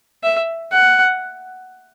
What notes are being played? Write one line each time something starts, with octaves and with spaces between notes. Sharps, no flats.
E5
F#5